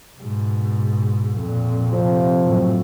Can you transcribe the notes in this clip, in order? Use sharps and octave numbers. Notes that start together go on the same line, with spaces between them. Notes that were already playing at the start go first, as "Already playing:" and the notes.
G#2 B2
F2 A#2
C3 F3 C4
F#2 A2